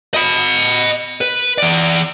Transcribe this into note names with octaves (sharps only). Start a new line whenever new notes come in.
D#5 B5
B4
E3 D5